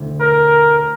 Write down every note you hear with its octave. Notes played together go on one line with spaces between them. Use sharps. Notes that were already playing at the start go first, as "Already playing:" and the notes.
Already playing: E1 D2 D3
A#4